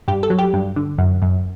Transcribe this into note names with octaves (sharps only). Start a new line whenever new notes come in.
G2 G4
A4
F#3
G4
G2
D3
F#2
F#2